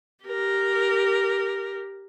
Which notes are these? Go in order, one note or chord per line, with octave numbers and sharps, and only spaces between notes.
G4 A#4